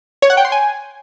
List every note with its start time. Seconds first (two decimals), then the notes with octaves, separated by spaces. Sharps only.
0.22 C#5
0.30 F#5
0.37 G5
0.45 C6
0.52 G#5